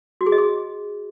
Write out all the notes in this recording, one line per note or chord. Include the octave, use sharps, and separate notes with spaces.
F#4
G#4
D#5
G#4